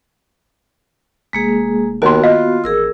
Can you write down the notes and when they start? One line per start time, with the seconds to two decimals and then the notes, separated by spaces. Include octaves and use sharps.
1.33 F1 G#3 A#3 G#4
2.02 D#2 D#3 A#3 B3 F#4 C6
2.24 F4 D#5
2.64 A1 G#4 A#4 E6